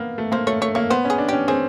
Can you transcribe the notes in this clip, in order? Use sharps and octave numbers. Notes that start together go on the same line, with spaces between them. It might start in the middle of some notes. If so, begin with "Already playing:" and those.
Already playing: A#3 B3
A3
A#3 C5
A3 C#5
A3 C#5
A#3 C#5
B3 C5
C#4
G#4
D4
C#4 G4
C4 G#4